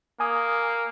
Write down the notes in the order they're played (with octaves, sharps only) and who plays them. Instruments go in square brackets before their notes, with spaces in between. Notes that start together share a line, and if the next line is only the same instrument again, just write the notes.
[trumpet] A#3 [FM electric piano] G#5 D#6